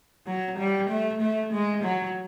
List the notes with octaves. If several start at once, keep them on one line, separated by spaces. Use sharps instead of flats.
F#3
G3
A3
A3
G#3
F#3